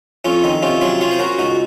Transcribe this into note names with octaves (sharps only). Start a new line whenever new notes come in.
F2 C#4 F4
D#3 D#4
C3 C#4 F4
F#3 F4 G#4
C#4 F4 G#4
C5
C#4 F#4 A#4
C#2 D#4 F#4